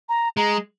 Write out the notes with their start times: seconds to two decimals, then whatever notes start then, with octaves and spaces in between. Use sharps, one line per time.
0.09 A#5
0.37 G#3 A#5